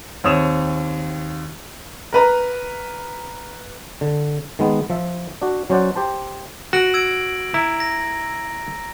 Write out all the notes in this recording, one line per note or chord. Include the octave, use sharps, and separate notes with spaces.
D#2 C4 C#5 D#6 E7 F7
A#4 B4 A#5
D3
D#3 G#3 B3
F3 E5
D4 F#4
F#3 C#4 C5 D5 F#5
G4 C5 A5
F#4 A#6 D7 F#7
E6 G#6 D7
E4 A#5
A#6